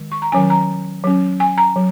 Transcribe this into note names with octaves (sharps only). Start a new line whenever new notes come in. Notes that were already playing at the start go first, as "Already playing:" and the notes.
Already playing: D#3 G#3
C#6
A#5
D#3 F#3 C#4 G#5
A#5
F#3 C#4
G#5
A#5
F#3